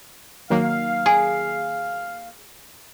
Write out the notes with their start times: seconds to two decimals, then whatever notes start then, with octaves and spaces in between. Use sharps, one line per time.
0.50 D#3 F#3 A#3 F5
1.06 G#4 G#5